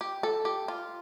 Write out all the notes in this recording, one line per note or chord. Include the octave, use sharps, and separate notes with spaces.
G4
A4
G4
F4